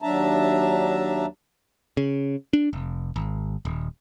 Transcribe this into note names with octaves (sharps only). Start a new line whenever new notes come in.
D#2 F#3 D4 E5 A5 A#5
C#3
D4
F1
G#1
D#1